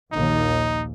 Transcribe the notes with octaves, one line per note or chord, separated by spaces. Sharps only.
A#1 D#2 D#4